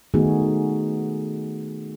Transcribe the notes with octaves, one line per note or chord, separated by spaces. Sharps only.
D#3 A3 B3 D#4 F#4 G#4